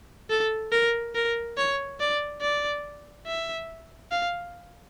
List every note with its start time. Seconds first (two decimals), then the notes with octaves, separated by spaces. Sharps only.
0.30 A4
0.72 A#4
1.15 A#4
1.58 C#5
2.00 D5
2.41 D5
3.27 E5
4.11 F5